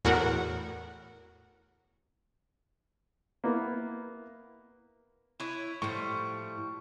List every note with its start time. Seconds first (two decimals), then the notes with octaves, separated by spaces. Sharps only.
0.05 E2 A2 F#4 A#4 F#5
3.44 A#3 B3 E4
5.40 E4 B4 C#5
5.82 A2 F3 G3 C#6